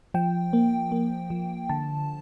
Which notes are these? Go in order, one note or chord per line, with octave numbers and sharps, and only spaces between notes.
F3 G5
A#3
A#3
F3
D3 A5